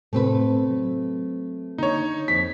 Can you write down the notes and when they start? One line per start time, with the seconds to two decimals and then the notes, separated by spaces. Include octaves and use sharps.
0.13 A2 C3 A3 C4 A4 B4
0.71 F#3
1.78 D3 A#3 D#4 C#5
2.28 F2 B6 C7